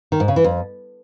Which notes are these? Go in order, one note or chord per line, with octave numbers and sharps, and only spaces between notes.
D#3
G#2
C#3
E3
F2